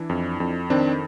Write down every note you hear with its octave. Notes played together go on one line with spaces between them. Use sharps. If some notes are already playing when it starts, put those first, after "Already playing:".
Already playing: E3 D4 E4
F2
F2
D#3 C4 D4